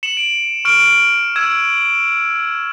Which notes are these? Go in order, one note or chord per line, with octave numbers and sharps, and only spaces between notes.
C#7 E7 F#7
D7
C#6 F6 D7
E6 G#6 D#7 E7